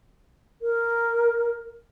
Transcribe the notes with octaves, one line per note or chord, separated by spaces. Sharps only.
A#4